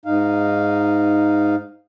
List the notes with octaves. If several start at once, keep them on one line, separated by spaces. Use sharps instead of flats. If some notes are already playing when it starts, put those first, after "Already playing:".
G#2 D#4 F5